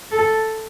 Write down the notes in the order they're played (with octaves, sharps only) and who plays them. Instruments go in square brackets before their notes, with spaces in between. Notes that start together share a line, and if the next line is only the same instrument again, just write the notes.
[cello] A4